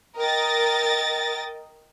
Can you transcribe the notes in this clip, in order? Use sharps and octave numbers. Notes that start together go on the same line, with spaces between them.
A#4 D#5 G5 A6 A#6